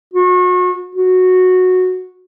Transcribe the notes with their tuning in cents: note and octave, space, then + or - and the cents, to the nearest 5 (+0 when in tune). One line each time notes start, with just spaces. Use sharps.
F#4 -35
F#4 -10